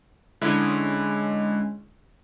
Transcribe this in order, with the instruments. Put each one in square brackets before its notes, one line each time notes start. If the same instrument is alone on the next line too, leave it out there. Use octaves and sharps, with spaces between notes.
[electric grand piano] D3 E4 [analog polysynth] G#3 C#4